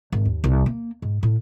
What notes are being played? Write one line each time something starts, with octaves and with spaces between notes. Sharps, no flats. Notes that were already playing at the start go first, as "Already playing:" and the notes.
G#1
D#2
C2
A#3
G#2
A2